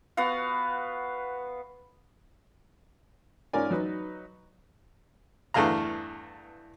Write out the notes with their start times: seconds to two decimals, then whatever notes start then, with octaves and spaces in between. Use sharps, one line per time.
0.17 B3 F#4 F5 F#5
3.53 G#2 C#4 F4 A#4 D5 G#5
3.71 F#3 D#4 B4
5.54 E2 G2 A3 G#4 F5 A#5